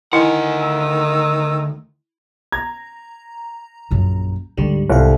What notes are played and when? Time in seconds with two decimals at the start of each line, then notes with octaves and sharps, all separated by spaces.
0.13 D2 D#3 E4 F#5 G#5
0.60 E6
2.52 A#5 G#6
3.91 A#1 F#2
4.57 D2 G#2 D3 G3
4.90 C2 A4 F5 F#5